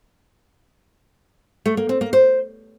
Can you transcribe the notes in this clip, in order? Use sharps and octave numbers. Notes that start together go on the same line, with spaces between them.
A3
A#3
C4
A#3
C5